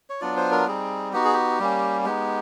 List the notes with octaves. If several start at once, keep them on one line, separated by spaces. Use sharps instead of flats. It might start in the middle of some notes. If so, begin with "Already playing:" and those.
C#5
F#3 B3 D4 F4 D5
C5
A#4
G3 C4 D#4 G#4
B3 D#4 F#4 G4
G#4
G4
G3 A#3 C#4
G#3 B3 D#4 G4